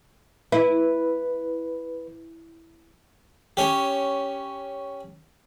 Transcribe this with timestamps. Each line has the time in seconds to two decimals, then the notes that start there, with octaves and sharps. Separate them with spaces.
0.52 E4 B4
3.57 C#4 G4